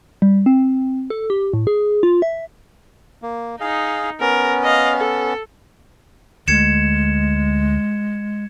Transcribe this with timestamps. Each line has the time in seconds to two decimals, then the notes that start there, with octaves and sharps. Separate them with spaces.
0.22 G3
0.46 C4
1.10 A4
1.30 G4
1.54 A2
1.67 G#4
2.03 F4
2.22 E5
3.22 A#3
3.60 D#4 G#4 F5
4.20 B3 C#4 A#4
4.63 D#5 F5
4.97 A4
6.48 D2 G#3 A3 G#6 C#7 E7